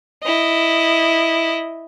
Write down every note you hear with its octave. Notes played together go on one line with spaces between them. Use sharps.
E4 D#5